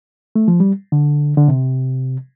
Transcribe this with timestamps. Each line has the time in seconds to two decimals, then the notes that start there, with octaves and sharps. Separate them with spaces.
0.36 A3
0.48 F3
0.60 G3
0.92 D3
1.37 D3
1.48 C3